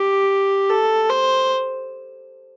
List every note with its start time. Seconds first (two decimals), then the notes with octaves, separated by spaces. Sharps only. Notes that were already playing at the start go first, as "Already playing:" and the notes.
Already playing: G4
0.70 A4
1.10 C5